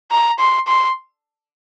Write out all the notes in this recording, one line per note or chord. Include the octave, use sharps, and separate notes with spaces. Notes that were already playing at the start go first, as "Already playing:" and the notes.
A#5
C6
C6